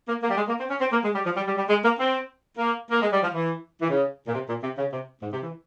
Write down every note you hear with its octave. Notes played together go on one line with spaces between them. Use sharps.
A#3
A#3
G3
G#3
A#3
C4
C#4
C4
A#3
G#3
G3
F3
G3
G3
G3
G#3
A#3
C4
A#3
A#3
G#3
G3
F3
E3
E3
C#3
A#2
C3
A#2
C3
C#3
C3
G#2
C3
E3